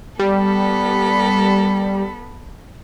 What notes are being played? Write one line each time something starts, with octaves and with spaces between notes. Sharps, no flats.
G3 B3 A4 B5